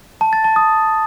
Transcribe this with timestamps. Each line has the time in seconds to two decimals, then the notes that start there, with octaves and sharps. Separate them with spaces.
0.21 A5
0.33 A6
0.44 A5
0.56 D#6